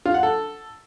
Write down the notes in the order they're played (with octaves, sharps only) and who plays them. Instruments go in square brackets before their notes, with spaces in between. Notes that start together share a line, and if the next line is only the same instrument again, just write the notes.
[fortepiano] F4
F#5
A4